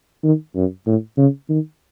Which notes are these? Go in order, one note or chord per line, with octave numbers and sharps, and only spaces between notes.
D#3
F#2
A2
C#3
D#3